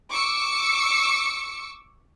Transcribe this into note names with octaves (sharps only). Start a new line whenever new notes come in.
C#6 D6 E6 C#7